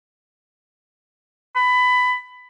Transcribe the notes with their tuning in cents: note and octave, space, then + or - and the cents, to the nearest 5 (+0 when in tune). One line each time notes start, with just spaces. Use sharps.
B5 +15